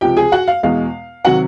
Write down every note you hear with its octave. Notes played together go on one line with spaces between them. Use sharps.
C#2 C3 F3 G4 G5
G#4 G#5
F#4 F#5
F5
E2 B2 G#3 F5
C3 D#3 F#3 F#4 F#5